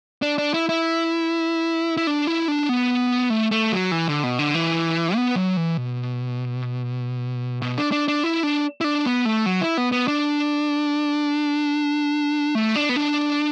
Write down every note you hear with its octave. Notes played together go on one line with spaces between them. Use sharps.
D4
D4
E4
E4
E4
D4
E4
D4
B3
A3
A3
F#3
E3
D3
B2
D3
E3
B3
F#3
E3
B2
B2
D4
D4
D4
E4
D4
E4
D4
B3
A3
F#3
E4
B3
B3
D4
A3
D4
B3
D4